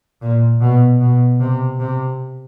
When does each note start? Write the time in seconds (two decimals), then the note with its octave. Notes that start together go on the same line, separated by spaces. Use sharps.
0.21 A#2
0.61 B2
1.01 B2
1.40 C3
1.80 C3